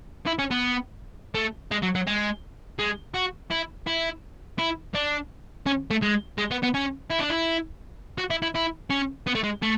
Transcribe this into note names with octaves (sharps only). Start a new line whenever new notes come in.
E4
C#4
B3
A3
G#3
F#3
F#3
G#3
G#3
F#4
E4
E4
E4
D4
C#4
A3
G#3
G#3
B3
B3
C#4
E4
D4
E4
F#4
E4
E4
E4
C#4
B3
A3
G#3
A3